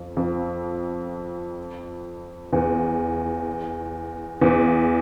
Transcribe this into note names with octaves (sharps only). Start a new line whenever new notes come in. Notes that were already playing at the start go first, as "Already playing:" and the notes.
Already playing: F2
F2
E2
E2